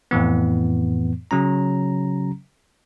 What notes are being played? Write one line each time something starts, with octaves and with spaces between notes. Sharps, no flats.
F2 A2 E3 B3
C#3 F#3 C#4 A#5